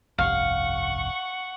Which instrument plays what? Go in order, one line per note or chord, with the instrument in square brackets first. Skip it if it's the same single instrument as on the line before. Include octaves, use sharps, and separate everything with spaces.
[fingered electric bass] G1 C2 F2 [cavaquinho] F5 [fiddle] F#5 C#6